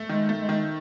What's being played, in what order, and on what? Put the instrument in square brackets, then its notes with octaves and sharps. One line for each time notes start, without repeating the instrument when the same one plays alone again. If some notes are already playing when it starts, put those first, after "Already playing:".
Already playing: [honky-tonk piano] A3
[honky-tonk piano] D#3 [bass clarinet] G#3
[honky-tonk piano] A3
[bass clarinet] G#3
[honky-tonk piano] D#3